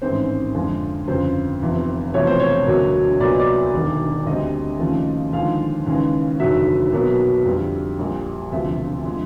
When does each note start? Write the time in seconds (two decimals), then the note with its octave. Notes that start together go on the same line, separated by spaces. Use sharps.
0.02 A1 G#2 D#3 G#3 C4 C5
0.55 F2 D3 F3 G#3
1.08 G1 F2 C#3 C5
1.61 F1 E2 C3 F3
2.14 E1 E2 C3 F3 A3 C#5
2.27 C5
2.40 C#5
2.67 E1 D2 D3 F#3 A#3
3.20 C2 A#2 F#3 B3 D5
3.30 D#5
3.40 D5
3.74 E1 D#2 D3
4.26 D2 D3 G3 C4 D#5
4.79 D#2 C#3 F3 A3
5.33 D#2 D3 F3 G#3 F5
5.86 D#2 C#3 E3 G#3
6.39 F1 D#2 D3 F#3 E5
6.92 B1 B2 F#3 A#3
7.45 F2 D3 G3
7.99 A#1 A#2 G3
8.52 E1 D2 C3 F3 E5
9.05 D3 F3 G#3